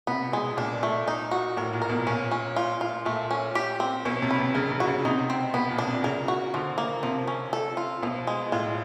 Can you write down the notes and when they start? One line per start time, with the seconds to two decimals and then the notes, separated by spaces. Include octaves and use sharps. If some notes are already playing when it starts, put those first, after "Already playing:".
0.07 C3 B3
0.32 B2 G#3
0.57 A#2 D4
0.83 A3
1.08 D#4
1.31 F#4
1.57 A2 A#4
1.73 A#2
1.82 A#4
1.89 B2
2.07 A#2 C#4
2.31 C#4
2.56 F4
2.81 F4
3.05 A#2 A3
3.31 C#4
3.55 G4
3.80 C4
4.05 B2 C#4
4.22 C3
4.31 B4
4.39 C3
4.55 C#3 A#4
4.72 C#3
4.80 F#4
4.87 C#3
5.05 C3 D#4
5.30 C4
5.54 B2 B3
5.71 A#2
5.79 D4
5.87 C3
6.04 C#3 A#4
6.28 F#4
6.54 D3 F3
6.78 A#3
7.03 C3 F3
7.27 C#4
7.53 A4
7.77 F4
8.02 B2 F3
8.27 G#3
8.52 A2 F4